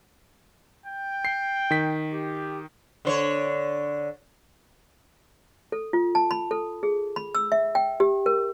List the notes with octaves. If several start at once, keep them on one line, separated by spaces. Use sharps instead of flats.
G5
C7
D#3 B6
G4
D3 C5 C#5
A4
F4
A5
B5
A4
G#4
B5
E6
E5
G5
G4
A#4